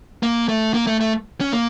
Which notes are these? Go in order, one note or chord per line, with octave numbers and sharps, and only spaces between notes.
A#3
A3
A#3
A3
A3
C#4
A#3